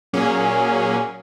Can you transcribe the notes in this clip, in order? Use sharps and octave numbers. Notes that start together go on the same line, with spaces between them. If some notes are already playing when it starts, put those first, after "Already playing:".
A#2 F#3 A#3 C#4 G#4